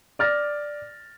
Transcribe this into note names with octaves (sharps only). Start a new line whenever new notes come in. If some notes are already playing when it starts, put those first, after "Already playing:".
D5 F6 A6 A#6